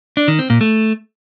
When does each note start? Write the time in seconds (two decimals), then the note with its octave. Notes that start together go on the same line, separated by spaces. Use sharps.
0.17 D4
0.28 D#3
0.39 C4
0.50 A#2
0.61 A3